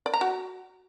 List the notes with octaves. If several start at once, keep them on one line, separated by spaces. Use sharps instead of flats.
D5
A#5
F#4